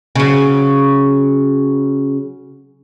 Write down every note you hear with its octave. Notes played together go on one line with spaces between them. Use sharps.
C#3 F#3